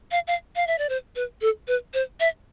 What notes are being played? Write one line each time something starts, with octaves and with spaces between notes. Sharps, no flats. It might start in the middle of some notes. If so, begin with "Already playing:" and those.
F5
F5
F5
E5
D5
C5
B4
A4
B4
C5
E5